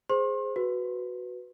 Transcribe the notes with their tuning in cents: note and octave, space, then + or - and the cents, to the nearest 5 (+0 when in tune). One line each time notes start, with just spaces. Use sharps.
G#4 +0 C5 +0 C6 +35
F#4 +0 B4 +0